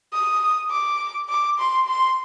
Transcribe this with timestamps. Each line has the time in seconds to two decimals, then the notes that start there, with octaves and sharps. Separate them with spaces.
0.13 D#6
0.71 D6
1.29 D6
1.59 C6
1.87 C6